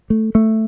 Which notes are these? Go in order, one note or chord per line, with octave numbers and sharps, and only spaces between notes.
A3
A3